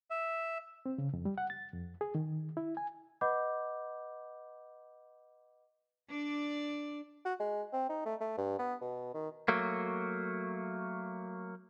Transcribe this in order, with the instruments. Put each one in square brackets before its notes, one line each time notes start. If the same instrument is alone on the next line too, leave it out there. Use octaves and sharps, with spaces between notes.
[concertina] E5
[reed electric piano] C4
C#3
F2
G3
F#5
A6
F2
G#4
D#3
E4
G#5
[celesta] B4 D#5 F#5 B5 D6 G6
[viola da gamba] D4 D5
[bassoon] F#4
G#3
C4
D#4
A3
A3
G2
B3
B2
D#3
[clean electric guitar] F#3 A3 A#3